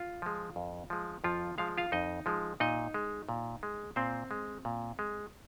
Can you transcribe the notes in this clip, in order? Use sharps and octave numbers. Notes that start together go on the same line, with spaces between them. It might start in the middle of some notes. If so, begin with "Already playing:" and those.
Already playing: F4
F3 G#3
F2
F3 G#3
F2 F3 F4
F3 G#3 F5
F4 F5
F2 D#4 D#5
F3 G#3
A#2 D#4 D#5
G#3
A#2
G#3
A#2 C4 C5
G#3
A#2
G#3